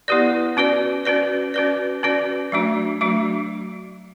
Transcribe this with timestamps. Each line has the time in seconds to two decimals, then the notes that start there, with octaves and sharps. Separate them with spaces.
0.08 B3 E4 G4 B4 D5
0.57 C#4 F#4 B4 D5
1.05 C#4 F#4 B4 D5
1.54 C#4 F#4 B4 D5
2.03 C#4 F#4 B4 D5
2.52 F#3 A3 D4 F#4
3.01 F#3 A3 D4 F#4